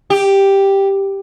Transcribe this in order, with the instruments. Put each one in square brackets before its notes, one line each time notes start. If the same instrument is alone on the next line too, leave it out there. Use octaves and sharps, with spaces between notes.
[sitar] G4